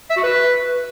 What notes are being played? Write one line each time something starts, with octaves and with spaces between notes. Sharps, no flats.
E5
F#4
B4